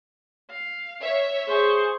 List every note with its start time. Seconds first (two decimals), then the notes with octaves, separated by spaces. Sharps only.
0.50 F5
1.01 C#5 E5
1.48 G#4 C5 C#6